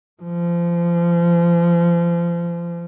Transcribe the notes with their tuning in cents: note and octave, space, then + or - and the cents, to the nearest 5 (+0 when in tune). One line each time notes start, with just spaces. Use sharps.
F3 -30